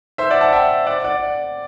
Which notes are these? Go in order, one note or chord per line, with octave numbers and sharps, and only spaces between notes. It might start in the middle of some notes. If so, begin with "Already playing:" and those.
C5 E5
D5 F#5
F#5 A5
E5 G5
D5 F#5
D5 F#5